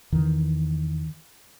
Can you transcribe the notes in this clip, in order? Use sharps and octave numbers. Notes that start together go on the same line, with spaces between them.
E2 D#3 E3